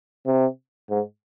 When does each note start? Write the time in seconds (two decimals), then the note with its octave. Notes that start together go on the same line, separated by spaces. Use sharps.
0.26 C3
0.90 G#2